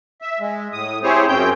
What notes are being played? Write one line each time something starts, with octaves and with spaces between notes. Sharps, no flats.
E5
G#3
A2 D#6
C4 E4 G4 G#4 C5 C#5
F#2 C#3 C4 C#4 G5 G6